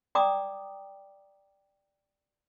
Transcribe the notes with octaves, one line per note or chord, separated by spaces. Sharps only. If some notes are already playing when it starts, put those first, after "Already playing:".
D5 G5 A#5 D6 D#6